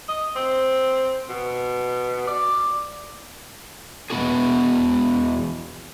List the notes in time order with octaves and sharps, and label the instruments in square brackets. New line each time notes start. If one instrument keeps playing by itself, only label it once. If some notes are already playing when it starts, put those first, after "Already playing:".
[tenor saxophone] D#5
C4
B2
D5
[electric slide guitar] E2 G#3 B3 F#4 G#4